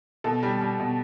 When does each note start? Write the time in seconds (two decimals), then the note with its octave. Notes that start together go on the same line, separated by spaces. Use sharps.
0.24 B2 A4
0.43 G3
0.61 G3
0.80 B2